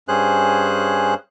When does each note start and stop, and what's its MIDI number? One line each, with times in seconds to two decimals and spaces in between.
0.08 1.14 43
0.08 1.14 61
0.08 1.14 68
0.08 1.14 72
0.08 1.14 90